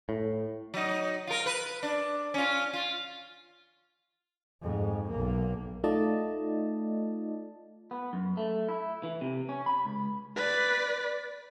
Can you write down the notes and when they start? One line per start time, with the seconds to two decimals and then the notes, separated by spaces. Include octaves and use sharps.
0.09 A2
0.74 F#3 D#4
1.27 F4 A#4
1.46 B4
1.83 D4
2.34 C#4 F4
2.73 F4
4.62 F2 G#2
5.10 B1 A#3
5.84 A3 D#4 F4 D5 D#5 A5
7.91 B3
8.13 F#2
8.37 A3
8.69 E4
9.03 E3
9.21 C3
9.49 C#4
9.66 B5
9.85 C#2
10.36 B4 D5